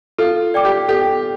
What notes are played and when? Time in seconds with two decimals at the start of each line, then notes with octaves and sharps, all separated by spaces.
0.18 F4 A4
0.54 D5 G5 D6
0.65 G4
0.88 G4 A4